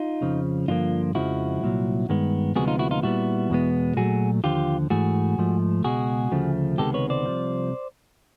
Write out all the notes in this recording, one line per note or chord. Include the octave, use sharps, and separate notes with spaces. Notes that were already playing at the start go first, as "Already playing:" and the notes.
Already playing: D#4 F4
F2 C#3 F3
G2 D3 F3 A#3 D#4 F4
F2 C#3 F3 G#3 E4 F#4
C2 A#2 F#3
G2 D#3 G#3 B3
D2 C3 F3 G#3 B3 F#4 G#4
D#4 F4
E4 F#4
D#4 F4
A#2 G3 B3 E4 F#4
E2 B2 G#3 B3
A#2 F#3 A3 F#4 G#4
D#2 D3 F3 F4 G4
G#2 E3 A3 F#4 G#4
G#2 F3 A3
C#2 B2 G#3 F#4 G#4
D2 C#3 F3 A3
C#2 C3 D#3 G#3 B3 G4 A4
B4 C#5
C5 D5
C2 C3 F3